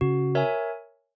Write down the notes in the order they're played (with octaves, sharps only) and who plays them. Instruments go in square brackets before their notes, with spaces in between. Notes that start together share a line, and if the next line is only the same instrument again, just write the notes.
[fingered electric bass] C#3 [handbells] F#4
[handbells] A#4 C#5 E5 G#5